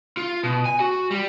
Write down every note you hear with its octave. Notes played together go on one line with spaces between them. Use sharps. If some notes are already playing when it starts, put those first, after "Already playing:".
F4
B2
G#5
F#4
G3